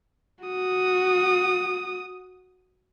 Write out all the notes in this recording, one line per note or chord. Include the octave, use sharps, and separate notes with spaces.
F#4 D#6